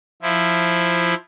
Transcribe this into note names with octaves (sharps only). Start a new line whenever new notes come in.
F3 E4